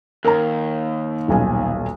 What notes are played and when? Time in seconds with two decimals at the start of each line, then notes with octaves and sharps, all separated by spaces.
0.25 D#2 A#4 A#5
1.28 D#1 B1 G#5